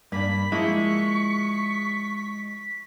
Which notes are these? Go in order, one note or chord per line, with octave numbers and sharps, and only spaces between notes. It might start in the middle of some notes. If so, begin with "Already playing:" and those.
G2 A#3 D4 B5 B6
F3 G#3 A#3 E4 C#6